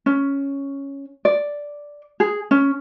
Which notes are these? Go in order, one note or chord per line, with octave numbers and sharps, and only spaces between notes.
C#4
D5
G#4
C#4